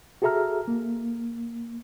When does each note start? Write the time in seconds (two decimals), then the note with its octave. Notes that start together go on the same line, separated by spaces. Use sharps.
0.22 F#4 G#4 A4 E5 A#5 F6
0.68 A#3